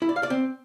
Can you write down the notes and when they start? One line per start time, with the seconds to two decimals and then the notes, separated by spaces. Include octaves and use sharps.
0.02 E4
0.09 D5
0.16 F5
0.23 D5
0.30 C4